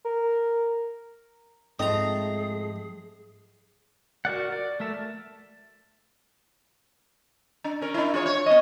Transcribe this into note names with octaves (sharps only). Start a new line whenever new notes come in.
A#4
G#2 F3 A3 C4 G#4 D#5 A#5
F#4 A#4 D5 F#5
D5
A3 A#4 E5 A5
D4
C#4 A#4
D4 E4
F4 G#4 C#5
C#5
B3 D#5